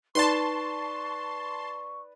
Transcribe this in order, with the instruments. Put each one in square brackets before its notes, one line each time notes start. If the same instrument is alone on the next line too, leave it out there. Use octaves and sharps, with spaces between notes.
[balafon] D#4 [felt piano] B4 D5 [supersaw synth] A5 C6 [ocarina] C#6